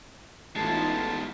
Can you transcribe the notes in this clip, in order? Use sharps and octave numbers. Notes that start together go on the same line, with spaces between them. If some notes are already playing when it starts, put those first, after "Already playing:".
A1 G#3 B3 D#4 F4 A5